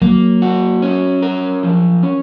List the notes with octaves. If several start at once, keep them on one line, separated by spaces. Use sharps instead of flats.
F#3 A#3
F#4
C#4
A#4
F3
C#4